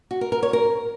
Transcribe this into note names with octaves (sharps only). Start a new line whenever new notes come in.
F#4
A#4
A#4
C#5
A#4